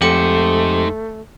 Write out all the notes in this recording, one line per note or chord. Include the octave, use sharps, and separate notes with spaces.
F2 G#2 A3 G4 C5 C#7